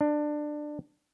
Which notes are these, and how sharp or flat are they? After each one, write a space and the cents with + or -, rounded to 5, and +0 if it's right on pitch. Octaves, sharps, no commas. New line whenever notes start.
D4 +20